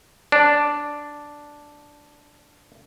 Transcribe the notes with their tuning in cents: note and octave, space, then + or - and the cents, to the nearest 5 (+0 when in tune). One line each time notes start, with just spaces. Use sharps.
D4 -5